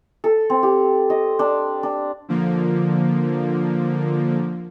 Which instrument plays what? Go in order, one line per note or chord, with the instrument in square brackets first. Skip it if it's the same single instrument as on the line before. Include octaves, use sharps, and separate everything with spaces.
[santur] A4
C4
G4
D#5
D4
D4
[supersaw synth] D3 F3 A#3